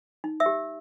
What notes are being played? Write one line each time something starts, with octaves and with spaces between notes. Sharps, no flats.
D#4
E5 E6
G4